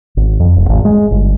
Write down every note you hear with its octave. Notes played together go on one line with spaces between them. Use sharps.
G#1
F2
E1
G#1
G#3
G1